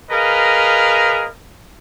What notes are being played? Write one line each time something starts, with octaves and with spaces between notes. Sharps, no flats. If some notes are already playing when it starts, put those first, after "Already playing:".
G#4 A#4 B4 D#5 F5